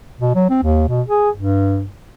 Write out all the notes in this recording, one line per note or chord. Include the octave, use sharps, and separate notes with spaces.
B2
F#3
C4
D#2
B2
G#4
G2